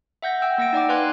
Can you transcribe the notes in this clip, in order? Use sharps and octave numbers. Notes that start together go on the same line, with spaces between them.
E5 F#5 G6 A#6
G5 E6
A#3 F#5 A#6 D7
D#4 D5 G5 D6
B4 F5 G#5 C6 F#6 G#6